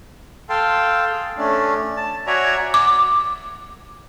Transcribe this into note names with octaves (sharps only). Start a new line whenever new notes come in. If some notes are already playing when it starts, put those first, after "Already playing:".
A4 F5 G5 A5 C6
G#4
A3 C#4 D4
A5
F#4 C#5 D5 E5 G#5 A#5
D6